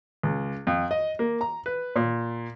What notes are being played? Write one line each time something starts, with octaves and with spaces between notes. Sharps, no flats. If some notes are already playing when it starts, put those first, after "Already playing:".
C#2
F2
D#5
A#3
A#5
B4
A#2